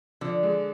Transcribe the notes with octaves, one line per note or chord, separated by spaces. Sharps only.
D3 F3
G#3